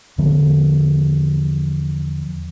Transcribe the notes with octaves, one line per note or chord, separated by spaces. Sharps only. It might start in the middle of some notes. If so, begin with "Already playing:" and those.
E2 D3 F3 B3